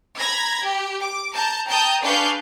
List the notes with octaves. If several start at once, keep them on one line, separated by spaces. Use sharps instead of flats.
A#5 B5 G#6 A#6
G4
D6
A5 A#5 G6
G5 A5 A#5 D#6 G6
D4 G#4 B4 F5 C#6 G6